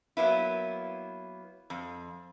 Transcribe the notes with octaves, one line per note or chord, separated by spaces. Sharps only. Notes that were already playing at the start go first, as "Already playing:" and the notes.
F#3 A#3 B3 E4
F2